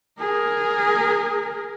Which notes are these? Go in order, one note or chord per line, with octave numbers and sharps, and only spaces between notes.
G#4 A#4